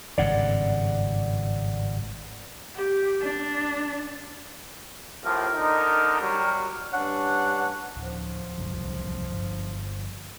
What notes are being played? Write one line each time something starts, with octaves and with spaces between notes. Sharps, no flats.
G#1 G2 C#3 D5 F#5
G4
D4
A2 C3 F3 A#4
D3 D#4
F#3 G3
G2 C#4 D4 F#5
D1 F3
D1 C2 F#2
G1